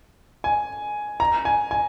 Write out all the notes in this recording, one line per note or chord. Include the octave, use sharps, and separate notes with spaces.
G#5
A#5
G#5
G#5